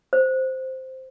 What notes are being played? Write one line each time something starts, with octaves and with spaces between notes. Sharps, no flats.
C5